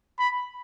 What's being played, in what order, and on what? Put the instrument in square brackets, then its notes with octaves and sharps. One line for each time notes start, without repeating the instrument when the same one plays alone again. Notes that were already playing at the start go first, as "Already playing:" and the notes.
[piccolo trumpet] B5